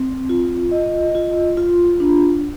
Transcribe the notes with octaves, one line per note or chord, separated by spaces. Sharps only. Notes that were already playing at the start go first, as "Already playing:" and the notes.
Already playing: C4
F4
D#5
F4
F4
D4